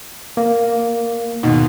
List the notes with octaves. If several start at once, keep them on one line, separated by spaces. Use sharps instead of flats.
A#3
D#2 G#2 B2